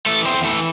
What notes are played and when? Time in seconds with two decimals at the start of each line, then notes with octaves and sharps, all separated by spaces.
0.06 E3 A3 A4
0.26 E2 C4 C5
0.44 E3 A3 A4